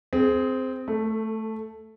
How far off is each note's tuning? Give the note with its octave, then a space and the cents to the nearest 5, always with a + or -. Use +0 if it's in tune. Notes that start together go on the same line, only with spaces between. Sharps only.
C4 -10 G#4 +20
A3 +0 A4 +25